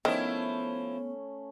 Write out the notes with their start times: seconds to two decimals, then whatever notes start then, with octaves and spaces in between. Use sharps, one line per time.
0.05 D#3 F3 A3 B3 C#4 E4 C5